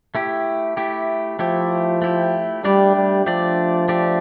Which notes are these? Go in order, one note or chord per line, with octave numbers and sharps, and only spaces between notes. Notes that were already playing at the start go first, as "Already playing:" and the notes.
A3 E4 G4
A3 E4 G4
F3 A3 E4 G4
A3 E4 G4
G3 A3 D4 G4 D5
G3
F3 A3 D4 G4 D5
A3 D4 G4 D5